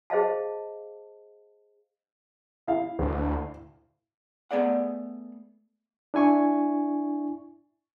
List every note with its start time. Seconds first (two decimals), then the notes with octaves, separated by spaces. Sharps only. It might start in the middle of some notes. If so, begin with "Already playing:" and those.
0.10 G#4 C5 D#5 F5 A5
2.67 E4 F5
2.99 D2
4.51 A3 B3 G#4 D5 F#5
6.14 D4 E4 G#5 C#6